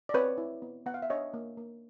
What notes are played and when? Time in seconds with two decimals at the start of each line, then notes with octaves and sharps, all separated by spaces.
0.09 D5
0.14 C4 B4 C#5
0.38 E4
0.62 B3
0.86 B3 F#5
0.94 F5
1.02 E5
1.10 D4 C#5 D#5
1.34 A#3
1.57 A#3